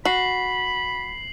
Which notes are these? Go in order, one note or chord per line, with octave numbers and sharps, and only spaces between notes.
F#4 B5 C7 F#7